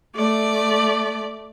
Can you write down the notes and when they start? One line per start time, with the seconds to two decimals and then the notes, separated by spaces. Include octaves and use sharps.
0.15 A3 D5